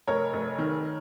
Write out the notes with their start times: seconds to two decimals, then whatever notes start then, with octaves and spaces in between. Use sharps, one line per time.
0.07 F1 A#4 C#5
0.33 F1
0.58 D#3